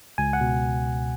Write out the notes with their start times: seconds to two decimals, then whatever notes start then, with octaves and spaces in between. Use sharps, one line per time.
0.18 C#2 G#5
0.33 F#5
0.41 B2